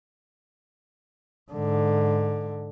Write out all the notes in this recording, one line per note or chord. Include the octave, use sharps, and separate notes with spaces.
G#2 D3